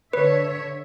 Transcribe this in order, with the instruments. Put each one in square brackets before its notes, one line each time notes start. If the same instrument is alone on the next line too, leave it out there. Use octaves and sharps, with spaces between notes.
[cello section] D3 C#5 E5 [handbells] B4